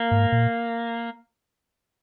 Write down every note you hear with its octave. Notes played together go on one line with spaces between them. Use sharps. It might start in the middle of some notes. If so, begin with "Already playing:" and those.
Already playing: A#3
G#2
A#2